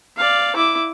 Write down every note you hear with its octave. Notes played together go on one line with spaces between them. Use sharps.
D5 F5
E4 D6